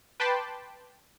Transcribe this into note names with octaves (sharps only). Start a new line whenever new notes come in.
B4 G5 A5 B5 C6 D6